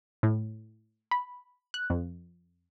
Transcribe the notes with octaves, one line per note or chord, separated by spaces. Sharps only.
A2
B5
F#6
F2